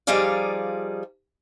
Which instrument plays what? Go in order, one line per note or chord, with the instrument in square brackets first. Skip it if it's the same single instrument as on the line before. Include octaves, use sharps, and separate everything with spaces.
[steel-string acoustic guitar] F3 G3 D#4 G#4 D5 F5